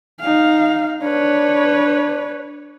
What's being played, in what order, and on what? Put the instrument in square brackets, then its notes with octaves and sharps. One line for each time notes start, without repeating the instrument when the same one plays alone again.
[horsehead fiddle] D#4 F5
[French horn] D4 [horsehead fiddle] B4 C#5